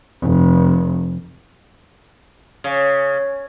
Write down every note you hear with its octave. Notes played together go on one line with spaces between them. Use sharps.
F1
C#3